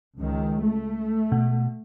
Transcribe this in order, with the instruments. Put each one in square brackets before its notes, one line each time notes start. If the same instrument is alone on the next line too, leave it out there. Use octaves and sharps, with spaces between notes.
[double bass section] C#2 D#3
A3
[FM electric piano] B2